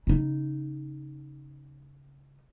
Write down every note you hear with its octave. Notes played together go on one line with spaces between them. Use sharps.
C#3 D#4